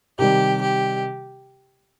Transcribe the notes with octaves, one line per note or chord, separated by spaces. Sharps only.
C3 D#3 G3 G4
G4